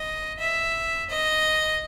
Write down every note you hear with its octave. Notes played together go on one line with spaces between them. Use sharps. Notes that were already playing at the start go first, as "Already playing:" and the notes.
Already playing: D#5
E5
D#5